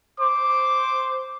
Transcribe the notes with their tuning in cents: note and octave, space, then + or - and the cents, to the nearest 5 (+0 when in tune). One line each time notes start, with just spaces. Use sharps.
C5 +0 D6 +0